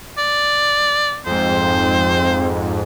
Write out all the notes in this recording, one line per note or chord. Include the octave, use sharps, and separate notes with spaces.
D5
F2 G#2 C4 C5